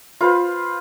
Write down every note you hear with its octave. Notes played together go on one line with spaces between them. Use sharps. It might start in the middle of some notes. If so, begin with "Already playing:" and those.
F4 B4 C5